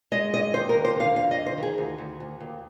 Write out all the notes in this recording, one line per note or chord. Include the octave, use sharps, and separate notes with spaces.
G#3 D#5
G2 D#5
D#2 C5
A#4
D#2
C5
D3 F5
F2 F5
D#5
F2
C5
D#3 G#4
D2
D2
D2
D#2